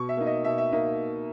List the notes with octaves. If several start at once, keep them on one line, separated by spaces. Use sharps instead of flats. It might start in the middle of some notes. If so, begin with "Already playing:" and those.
Already playing: B2 C#6
E5
A#3 D#4
D#5
B2 E5
E5
A#3 D#4 E5